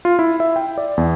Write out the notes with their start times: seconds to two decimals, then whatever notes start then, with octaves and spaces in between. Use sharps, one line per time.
0.05 F4
0.19 E4
0.40 E5
0.56 G5
0.78 D5
0.97 E2